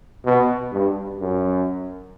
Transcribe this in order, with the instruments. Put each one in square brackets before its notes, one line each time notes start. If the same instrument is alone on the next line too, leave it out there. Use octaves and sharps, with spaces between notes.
[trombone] B2
G2
F#2